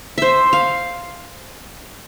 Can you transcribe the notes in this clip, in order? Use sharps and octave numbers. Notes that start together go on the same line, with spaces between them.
C5 E5
F5